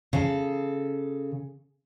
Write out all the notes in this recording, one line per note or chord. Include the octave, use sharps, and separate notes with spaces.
C#3 A4